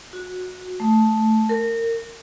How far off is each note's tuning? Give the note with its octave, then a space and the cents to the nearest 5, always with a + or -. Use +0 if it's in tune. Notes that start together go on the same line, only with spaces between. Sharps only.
F#4 -15
A3 -5
A#4 -25